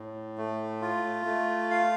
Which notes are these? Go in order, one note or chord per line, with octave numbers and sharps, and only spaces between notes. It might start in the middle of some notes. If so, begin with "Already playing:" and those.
Already playing: A2
A3
F4
A3
F5